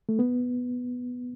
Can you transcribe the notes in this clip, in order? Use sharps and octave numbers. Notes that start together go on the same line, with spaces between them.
A3
B3